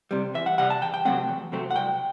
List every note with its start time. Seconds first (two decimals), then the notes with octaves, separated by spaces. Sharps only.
0.11 C3 G3
0.35 E2 E5
0.46 F#5
0.58 C3 G3 F#5
0.70 A5
0.82 E2 G5
0.94 G5
1.05 C3 F#3 A3 C4 F#5
1.29 E2
1.52 C3 F#3 A3 C4
1.71 F#5
1.76 C2 G5